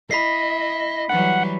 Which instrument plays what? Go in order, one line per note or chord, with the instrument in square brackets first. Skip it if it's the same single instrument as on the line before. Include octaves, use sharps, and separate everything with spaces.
[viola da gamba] E4 [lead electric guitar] D#5 [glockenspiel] B5 B6 C7
[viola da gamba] E3 F#3 G3 [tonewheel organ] F#5